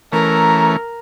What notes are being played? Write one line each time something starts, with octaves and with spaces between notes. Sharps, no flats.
E3 A3 C#4 A#4 A#5